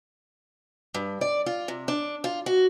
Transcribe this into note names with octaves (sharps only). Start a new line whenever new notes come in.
G2
D5
F4
C3
D4
F4
F#4